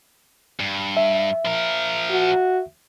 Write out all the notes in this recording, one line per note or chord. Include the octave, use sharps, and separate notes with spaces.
G2
E5
F3 A#4
F#4